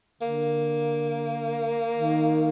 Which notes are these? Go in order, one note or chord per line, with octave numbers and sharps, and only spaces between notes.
D3 A#3
D#3